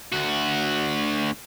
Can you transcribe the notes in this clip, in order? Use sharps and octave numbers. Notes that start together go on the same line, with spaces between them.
D2 F#4